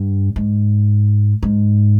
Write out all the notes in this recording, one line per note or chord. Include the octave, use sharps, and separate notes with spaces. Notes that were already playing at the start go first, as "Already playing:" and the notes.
Already playing: G2
G#2
G#2